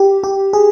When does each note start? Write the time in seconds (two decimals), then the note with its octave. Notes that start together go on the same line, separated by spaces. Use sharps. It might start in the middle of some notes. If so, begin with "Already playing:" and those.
Already playing: G4
0.23 G4
0.53 G#4